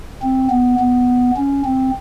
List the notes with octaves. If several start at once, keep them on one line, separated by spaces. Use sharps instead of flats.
C4
B3
B3
C#4
C4